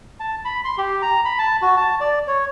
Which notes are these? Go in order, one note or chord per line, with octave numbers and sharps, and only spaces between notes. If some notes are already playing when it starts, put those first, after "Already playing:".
A5
B5
C6
G4
A#5
B5
A5
F#4
A5
D5
C#5